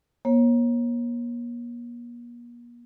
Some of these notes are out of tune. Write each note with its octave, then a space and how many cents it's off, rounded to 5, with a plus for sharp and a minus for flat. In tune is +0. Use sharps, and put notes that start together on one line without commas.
A#3 +40 C#5 -30